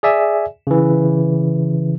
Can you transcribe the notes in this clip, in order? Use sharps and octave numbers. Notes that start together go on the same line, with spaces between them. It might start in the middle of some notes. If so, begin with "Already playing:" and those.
G#4 D5 E5 G#5
C#3 E3